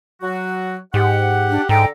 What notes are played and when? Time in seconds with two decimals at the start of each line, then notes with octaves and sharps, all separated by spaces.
0.22 F#3 F#4
0.94 G#2 G4 F#5
1.50 D4
1.69 G#2 D3 A4 G5 A#5